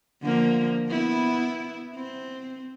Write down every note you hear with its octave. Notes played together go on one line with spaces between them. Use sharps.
D3 F3 A#3
B3 E4
C4